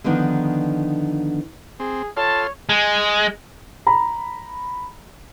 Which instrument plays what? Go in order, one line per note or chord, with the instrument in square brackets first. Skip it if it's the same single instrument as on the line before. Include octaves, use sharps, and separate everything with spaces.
[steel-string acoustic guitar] D3 D#3 F3 B3 D4 D#4
[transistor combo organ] C4 [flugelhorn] G#4
[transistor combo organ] F4 A4 C6 [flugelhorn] C#5 [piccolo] A5
[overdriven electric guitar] G#3
[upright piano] A#5 B5